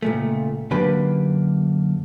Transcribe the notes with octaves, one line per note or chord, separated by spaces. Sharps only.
C#2 A#2 A3
F#2 D3 A#3 G4 B4